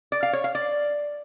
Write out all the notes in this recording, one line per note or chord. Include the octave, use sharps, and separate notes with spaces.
D5
F5
C#5
F5
D5